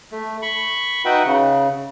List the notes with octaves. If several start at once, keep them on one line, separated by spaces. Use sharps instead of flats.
A3
B5 C#6
D#4 F#4 B4 E5 F#5 G5
C#3